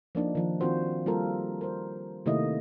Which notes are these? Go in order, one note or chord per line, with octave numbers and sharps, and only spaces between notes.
F3 A#3 D4 D#4
D#3 F3
D#3 C4 F4 F#4 C5
G3 A#3 F4 A4 A#4
A#4 C5
C3 D#3 A3 A#3 E4 D#5